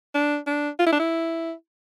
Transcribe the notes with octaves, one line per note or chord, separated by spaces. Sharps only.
D4
D4
F4
E4
D4
E4